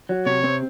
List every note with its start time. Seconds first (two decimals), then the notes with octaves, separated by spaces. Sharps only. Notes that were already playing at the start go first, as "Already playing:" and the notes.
0.09 F#3
0.26 C3 C#5
0.44 C4